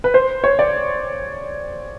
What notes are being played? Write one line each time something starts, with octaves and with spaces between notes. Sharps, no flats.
B4
C5
C#5
D5